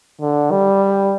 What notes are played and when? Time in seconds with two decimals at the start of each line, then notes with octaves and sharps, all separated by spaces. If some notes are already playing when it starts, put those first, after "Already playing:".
0.21 D3
0.51 G3